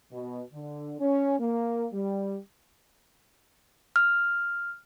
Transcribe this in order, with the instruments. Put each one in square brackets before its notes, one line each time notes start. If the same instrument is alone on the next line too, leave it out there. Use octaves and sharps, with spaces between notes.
[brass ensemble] B2
D3
C#4
A#3
G3
[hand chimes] F6